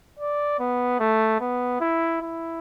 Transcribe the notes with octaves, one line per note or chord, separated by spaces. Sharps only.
D5
B3
A3
B3
E4
E4